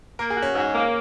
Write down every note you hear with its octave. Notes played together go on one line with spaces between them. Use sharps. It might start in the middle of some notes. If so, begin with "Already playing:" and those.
A#3 A#4
G#4
F#4
C#4
G#2
A#3